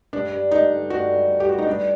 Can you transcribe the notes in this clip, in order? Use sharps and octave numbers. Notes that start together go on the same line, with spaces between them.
G2 D4
G2
D3 D#4
G2
G2 F#4
G2
G2
G4
G3 F#4
D#4
G3 D4